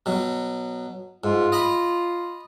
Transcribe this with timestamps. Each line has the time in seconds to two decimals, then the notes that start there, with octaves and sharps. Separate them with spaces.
0.06 B2 F#3
1.24 G#2 F4
1.52 D#5 A#5 B5